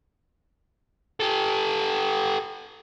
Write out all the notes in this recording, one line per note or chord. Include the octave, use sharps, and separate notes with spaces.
G4 A4